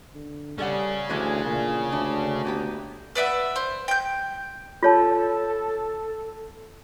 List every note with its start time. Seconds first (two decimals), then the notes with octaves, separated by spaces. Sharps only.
0.15 D3
0.58 G3 C#4 G#4 A4 D5 F#5
1.09 D2 E3 G#3 D4
1.46 A#2
1.92 D2 D4
2.45 A#3 B3 G4
3.15 B4 D5 E5 F#5
3.56 C5
3.88 G5 G6
4.83 F4 A4 C#5 A5